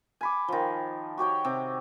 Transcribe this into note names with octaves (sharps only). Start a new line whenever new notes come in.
G#5 B5 D6
D#3 F3
F#4 G4 C#5 G5
C3